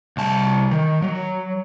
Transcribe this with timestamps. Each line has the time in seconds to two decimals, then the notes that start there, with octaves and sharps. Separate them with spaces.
0.17 C2 A5
0.71 D#3
1.02 F#3